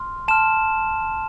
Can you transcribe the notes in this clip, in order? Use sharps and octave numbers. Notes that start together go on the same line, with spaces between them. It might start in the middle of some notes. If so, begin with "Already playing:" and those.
Already playing: C6 F6
A5 C6 F6 E7